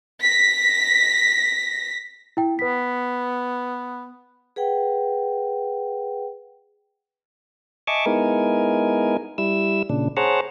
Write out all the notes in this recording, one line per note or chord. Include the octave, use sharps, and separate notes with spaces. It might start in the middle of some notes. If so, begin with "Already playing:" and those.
A#6 B6
E4 G5
B3 B4 B6
G#4 B4 F#5 G5
D#5 E5 G#5 A5 C#6 D6
G#3 B3 D#4 E4 A#4 G#5
G3 E4 E6
A#2 C#3 D4
G#4 C5 C#5 F#5 A5 A#5